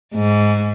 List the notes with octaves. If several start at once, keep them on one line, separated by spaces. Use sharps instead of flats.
G#2